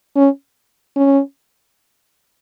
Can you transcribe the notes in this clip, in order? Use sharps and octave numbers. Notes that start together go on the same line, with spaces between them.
C#4
C#4